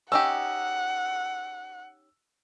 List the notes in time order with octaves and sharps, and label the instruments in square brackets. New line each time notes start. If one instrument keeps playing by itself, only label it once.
[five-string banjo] C#4 D#4 G4 [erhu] F#5 [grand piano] E6